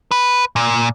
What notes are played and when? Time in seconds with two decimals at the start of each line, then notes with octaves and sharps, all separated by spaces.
0.11 B4
0.56 A#2